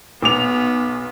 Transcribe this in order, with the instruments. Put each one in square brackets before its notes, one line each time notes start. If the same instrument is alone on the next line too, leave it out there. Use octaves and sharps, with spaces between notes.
[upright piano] B1 D6 F7 [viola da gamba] B3